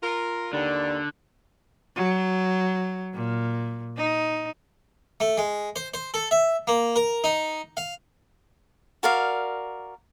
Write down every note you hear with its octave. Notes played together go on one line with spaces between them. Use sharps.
F4 A#4
D#2 D3 D5
F#3
A#2
D#4
A3
G#3
C5
C5
A4
E5
A#3
A#4
D#4
F5
F#4 A#4 D5 F5